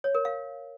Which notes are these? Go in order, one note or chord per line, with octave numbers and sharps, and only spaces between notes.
C#5
A#4
F5